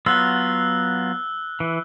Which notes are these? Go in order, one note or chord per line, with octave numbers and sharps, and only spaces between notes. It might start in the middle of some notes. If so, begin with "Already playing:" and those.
F#3 B3 F4 E6 F#6 G7
E3